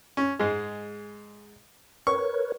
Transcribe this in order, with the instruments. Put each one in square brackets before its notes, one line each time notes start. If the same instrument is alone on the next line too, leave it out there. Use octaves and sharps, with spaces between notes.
[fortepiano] C#4
G#2 G#3
[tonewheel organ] A#4 B4 C#5 [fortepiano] C#6